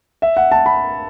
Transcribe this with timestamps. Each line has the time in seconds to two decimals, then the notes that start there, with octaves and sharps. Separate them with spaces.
0.22 E5
0.37 F#5
0.52 A5
0.66 B5